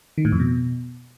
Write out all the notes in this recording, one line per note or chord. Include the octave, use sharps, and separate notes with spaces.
D#3
A2
F2
B2